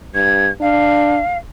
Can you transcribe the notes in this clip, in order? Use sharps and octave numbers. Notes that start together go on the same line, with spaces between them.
G2 G#6
D4 F5